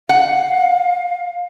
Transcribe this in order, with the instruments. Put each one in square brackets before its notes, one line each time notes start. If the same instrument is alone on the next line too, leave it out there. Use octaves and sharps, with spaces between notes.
[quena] F5 [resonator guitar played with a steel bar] F#5